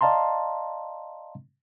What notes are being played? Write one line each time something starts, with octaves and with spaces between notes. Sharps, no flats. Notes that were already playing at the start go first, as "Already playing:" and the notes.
D5 D#5 F5 A5 A#5 C6